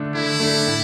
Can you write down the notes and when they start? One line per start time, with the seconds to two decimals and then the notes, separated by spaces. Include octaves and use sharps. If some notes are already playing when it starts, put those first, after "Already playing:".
Already playing: D3 A3 D4
0.15 D3 E4
0.40 A3 D4
0.67 A2